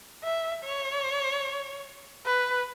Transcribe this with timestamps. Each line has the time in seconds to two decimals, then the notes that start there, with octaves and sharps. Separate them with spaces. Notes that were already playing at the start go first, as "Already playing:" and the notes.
0.24 E5
0.64 C#5
2.26 B4